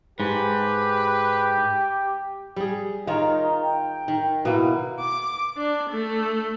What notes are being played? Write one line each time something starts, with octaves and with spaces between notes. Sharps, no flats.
G#2 G4 B4
G3 G#4
D#3 D#4 F4 C#5
G5
D#3
B2 A#3 E4
D6
D4
A3